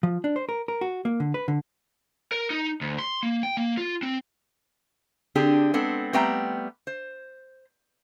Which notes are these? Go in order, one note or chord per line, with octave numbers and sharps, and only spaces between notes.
F3
D4
C5
A#4
A#4
F#4
A#3
D3
B4
D3
A#4
D#4
D2
C6
A#3
G5
A#3
F4
C4
D3 C4 D4 G4 G#4
G#3 B3 C4 D4 A4
G3 A3 B3 C4 G5 A#5
C5